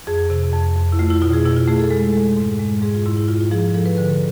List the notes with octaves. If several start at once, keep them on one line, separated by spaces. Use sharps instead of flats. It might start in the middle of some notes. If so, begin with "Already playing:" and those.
F2 G#4
C3
F2
F2
E4
A3 F4
E4
B2 F4
G#4
B2 E4
F4
A3 G#4
A4
G#3 A4
G#3
G#2
G#3
G#2 G#4
F4
G#2 E4
E4
G#2 F4
F4
F3 G#4
F3 A4
B4
D3 B4
A4